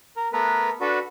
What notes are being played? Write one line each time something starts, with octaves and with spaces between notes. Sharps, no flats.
A#4
A3 B3 A#4 B4
D4 F#4 A4 B4